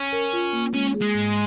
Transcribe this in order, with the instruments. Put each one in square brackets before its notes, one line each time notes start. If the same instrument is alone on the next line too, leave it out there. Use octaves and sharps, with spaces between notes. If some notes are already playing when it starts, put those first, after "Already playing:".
Already playing: [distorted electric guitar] C#4
[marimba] A#4
F4
A#3
[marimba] G#3 [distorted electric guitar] C#4
[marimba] G#4
[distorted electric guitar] G#3
[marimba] G#2